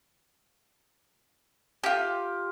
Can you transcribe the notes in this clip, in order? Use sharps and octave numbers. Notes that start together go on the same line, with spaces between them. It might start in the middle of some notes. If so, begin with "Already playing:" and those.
F4 G4